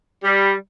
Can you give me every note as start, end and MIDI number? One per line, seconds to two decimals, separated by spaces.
0.24 0.52 55